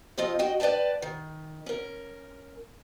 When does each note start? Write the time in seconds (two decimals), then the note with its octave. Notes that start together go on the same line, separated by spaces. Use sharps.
0.18 F3 C4 F4 D#5
0.39 F#4 D#5 G5
0.60 B4 D5 F5 G5 A5
1.02 D#3
1.66 C#4 A#4